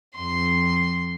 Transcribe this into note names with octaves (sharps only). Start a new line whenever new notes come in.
F2 C6